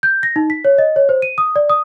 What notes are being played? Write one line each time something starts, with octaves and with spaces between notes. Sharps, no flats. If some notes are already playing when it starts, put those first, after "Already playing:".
G6
A#6
D#4
B6
C#5
D#5
C#5
C5
D#7
D#6
D5
D#6